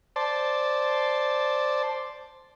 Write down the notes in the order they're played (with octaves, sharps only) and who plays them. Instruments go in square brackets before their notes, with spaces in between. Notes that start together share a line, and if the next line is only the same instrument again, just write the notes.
[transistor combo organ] C5 D5 A5